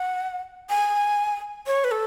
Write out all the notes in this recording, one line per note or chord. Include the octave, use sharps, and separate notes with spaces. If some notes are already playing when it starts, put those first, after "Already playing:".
Already playing: F#5
G#5
C#5
B4
A4